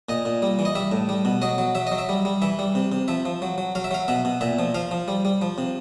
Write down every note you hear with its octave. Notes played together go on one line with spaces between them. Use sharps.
A#2 D#5
A#2
G3
E3
D#5
G3 E5
A2
G3
B2
F#3 D#5
F#3
F#3 E5
F#3 D#5
E5
G3
G3
E3 E5
G3
C3
C3
F3 E5
F3
F#3
F#3
F#3 F5
E5
F#3 F5
B2 E5
B2
A#2 E5
F3
F3 F5
F3
G3
G3
F3
C3